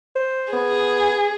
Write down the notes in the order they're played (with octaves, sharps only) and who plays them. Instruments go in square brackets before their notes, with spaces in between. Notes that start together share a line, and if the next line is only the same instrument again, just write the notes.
[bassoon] C5
[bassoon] B3 [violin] G#4